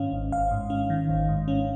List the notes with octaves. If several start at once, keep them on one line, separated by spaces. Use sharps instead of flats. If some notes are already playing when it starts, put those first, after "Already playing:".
Already playing: G#2 D#3 C#4 F5
G#1
G#1 F5
G#2
C#4
D#3
G#1
G#2
C#4